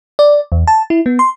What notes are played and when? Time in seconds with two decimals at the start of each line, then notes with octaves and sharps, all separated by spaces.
0.19 D5
0.52 E2
0.67 A5
0.90 E4
1.06 B3
1.19 C6